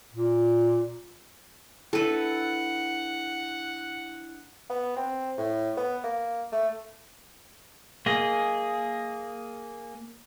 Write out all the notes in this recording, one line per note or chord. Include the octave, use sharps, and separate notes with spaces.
A#2
D4 E4 A4 B4 F#5
B3
C4
A2
B3
A#3
A3
A#3 G#4 D#5